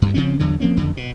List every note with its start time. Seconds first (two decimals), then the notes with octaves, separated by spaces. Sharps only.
0.02 D2 G2
0.14 C#3 F3 C4 C#4
0.39 E2 D3 F#3
0.60 F3 A#3 C4 C#4
0.77 F#1 F2 D3
0.97 B2